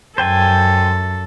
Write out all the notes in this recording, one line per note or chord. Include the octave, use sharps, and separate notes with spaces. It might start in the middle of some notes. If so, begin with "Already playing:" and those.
F#2 A4 C5 G5 G#5